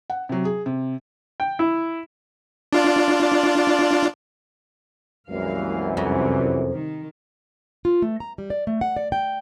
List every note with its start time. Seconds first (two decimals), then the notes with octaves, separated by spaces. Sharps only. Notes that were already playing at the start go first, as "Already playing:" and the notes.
0.10 F#5
0.29 C3 F#3
0.45 G#4
0.66 C3
1.40 G5
1.59 E4
2.73 D4 F4 D5
5.29 C2 F#2 E3 G#3 A#3 F5
5.97 F2 C3 G3 C#4
6.74 D#3
7.85 F4
8.02 A3
8.20 A#5
8.38 G3
8.50 D5
8.67 A3
8.81 F#5
8.97 D5
9.12 G5